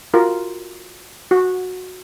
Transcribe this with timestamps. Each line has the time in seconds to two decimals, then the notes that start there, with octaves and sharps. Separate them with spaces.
0.14 F4 F#4 A#4
1.31 F#4